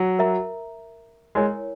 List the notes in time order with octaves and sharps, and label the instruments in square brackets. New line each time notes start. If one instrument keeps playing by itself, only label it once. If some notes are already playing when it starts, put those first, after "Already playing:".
Already playing: [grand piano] F#3
[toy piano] A#4 E5 A#5
[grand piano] G#3 [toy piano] E4 A#4 C#5 G#5